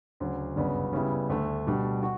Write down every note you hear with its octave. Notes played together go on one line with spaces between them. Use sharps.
D2 C#3 F#3
G1 F#2 C#3 F#3 B3
C#3 G3 B3 E4
D2 D3 A3
B2 G3 D4
F#4